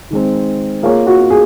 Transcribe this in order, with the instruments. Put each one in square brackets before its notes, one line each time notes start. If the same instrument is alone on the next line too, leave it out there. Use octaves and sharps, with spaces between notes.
[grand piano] D#3 G#3 C4
[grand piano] A#3 F4 A#4 C#5 [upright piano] G#4
[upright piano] F#4
G#4